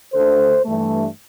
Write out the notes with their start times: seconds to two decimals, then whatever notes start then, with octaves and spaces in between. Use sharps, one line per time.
0.14 D2 D3 A3 A4 C5
0.65 G2 E3 A3